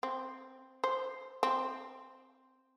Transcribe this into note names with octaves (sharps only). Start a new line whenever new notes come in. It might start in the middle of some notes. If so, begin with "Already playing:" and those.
C4
C5
C4